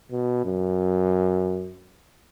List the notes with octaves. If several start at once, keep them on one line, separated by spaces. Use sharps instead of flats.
B2
F#2